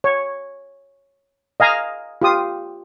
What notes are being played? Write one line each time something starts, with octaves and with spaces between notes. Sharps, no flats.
C#5
D#5 F5 G#5 A#5
F4 G4 D#6